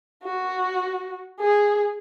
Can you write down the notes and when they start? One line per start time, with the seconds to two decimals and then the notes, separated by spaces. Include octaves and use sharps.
0.24 F#4
1.40 G#4